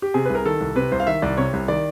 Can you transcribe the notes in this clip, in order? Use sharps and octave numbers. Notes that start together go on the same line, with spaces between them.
G4
C3 G#4
C2 B4
A#4
D#3 A4
C2
C3 B4
C2 C5
F5
D#3 E5
C2 D5
C3 C#5
C2
D#3 D5